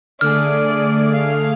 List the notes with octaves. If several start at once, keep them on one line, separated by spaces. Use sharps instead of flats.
D3 A3 G#4 D5 F6
F5